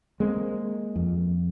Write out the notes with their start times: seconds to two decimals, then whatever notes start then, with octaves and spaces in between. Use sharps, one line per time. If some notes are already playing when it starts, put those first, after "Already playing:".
0.20 G#3 A#3 C4
0.96 F2